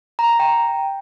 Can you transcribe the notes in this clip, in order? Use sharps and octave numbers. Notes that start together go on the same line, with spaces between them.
A#5
A#5
G5